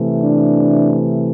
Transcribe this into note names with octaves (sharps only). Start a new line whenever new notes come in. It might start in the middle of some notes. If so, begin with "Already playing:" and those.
Already playing: C3 E3 A3
D4